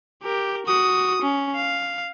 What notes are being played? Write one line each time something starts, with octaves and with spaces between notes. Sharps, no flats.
G4 A#4
F#4 D#6
C#4
F5